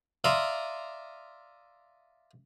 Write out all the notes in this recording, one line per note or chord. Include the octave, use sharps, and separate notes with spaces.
D5 E5 F5 A#5 C6 D#6